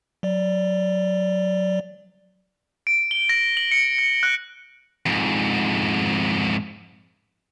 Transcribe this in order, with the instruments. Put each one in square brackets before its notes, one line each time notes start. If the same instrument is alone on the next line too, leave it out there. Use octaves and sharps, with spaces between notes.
[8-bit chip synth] F#3 D5
[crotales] D7
G7
A#6
F#7
C#7
C#7
F#6
[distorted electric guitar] F2 G#2